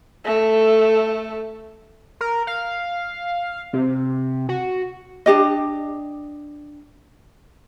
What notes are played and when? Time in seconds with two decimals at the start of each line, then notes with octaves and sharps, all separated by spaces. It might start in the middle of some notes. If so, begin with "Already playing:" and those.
0.24 A3 A4
2.21 A#4
2.47 F5
3.73 C3
4.49 F#4
5.26 D4 G4 D#5